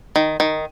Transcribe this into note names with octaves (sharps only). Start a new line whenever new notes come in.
D#3
D#3